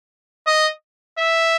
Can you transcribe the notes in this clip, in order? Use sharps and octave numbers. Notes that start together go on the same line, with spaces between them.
D#5
E5